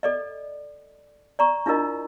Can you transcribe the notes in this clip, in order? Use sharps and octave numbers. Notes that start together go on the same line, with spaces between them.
A4 D5 D#5
D5 A#5 C#6
D4 E4 F4 A#4 D#5